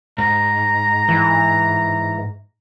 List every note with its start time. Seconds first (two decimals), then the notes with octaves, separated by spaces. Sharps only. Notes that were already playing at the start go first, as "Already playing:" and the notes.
0.18 G#2 A#5
1.08 E3